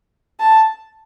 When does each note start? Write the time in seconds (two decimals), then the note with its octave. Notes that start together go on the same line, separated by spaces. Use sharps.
0.40 A5